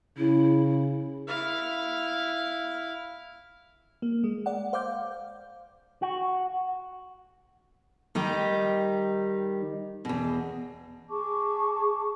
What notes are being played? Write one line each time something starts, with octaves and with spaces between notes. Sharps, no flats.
C#3 E4
E4 F5
A#3
G#3
D5 F#5
C5 F5 D6 G6
F#4
D#3 G3 D#4 G4
E2 B2
G#4 A5 C#6 D6